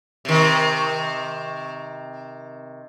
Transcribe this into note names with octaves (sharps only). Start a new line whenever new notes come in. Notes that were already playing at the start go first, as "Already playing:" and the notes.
C3 D#3